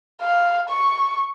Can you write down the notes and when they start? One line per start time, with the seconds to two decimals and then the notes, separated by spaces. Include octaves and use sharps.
0.21 F5
0.69 C#6